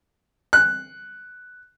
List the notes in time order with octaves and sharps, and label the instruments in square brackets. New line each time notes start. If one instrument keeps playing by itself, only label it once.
[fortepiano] F#6